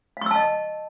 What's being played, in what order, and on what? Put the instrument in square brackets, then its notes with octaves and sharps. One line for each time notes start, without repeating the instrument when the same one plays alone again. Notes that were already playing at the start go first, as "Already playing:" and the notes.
[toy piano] F5
C#6
E6
A5
D#5